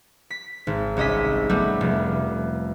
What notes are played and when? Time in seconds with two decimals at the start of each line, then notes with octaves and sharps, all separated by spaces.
0.30 B6
0.67 G#1
0.97 C2 C#4 D#5 E6 B6
1.49 G3 A3 B3
1.81 F1